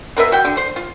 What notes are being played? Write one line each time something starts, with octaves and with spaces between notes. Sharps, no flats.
B2 A#4 B4 E5
F#4 G5
D3
C5
F4